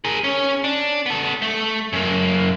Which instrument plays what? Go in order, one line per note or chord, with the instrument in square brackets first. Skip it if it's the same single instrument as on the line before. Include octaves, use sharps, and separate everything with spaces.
[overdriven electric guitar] G#4 A#4
C#4
D4
B3 A4
A3
F#2 A#3